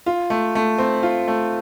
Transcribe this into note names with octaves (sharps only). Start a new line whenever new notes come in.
F4
A3
A3
C4
F4
A3